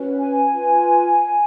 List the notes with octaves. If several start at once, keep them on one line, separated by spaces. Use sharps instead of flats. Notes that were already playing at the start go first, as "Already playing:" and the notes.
Already playing: C#4 F#4 B4
G#5
F4 B4